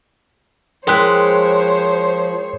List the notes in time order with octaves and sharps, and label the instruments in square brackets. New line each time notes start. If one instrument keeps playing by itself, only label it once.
[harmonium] F3 [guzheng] G#3 E4 [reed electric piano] A#4 G5 F#6 [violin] C5 C#5